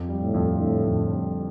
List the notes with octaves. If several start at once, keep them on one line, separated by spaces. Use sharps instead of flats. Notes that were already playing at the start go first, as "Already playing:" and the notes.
Already playing: F2
G3
A2
F2
A2 D3
F2
G3